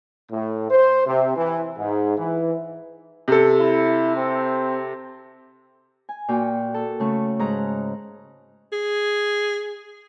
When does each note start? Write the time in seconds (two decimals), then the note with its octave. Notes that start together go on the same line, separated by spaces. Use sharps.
0.30 A2
0.70 C5
1.07 C3
1.36 E3
1.78 G#2
2.17 E3
3.28 C3 A4
3.59 E4
4.16 C4
6.09 G#5
6.29 A#2 F#4 G5
6.74 A4
7.00 C#3 A3
7.39 G#2 A#5 F#6
8.73 G#4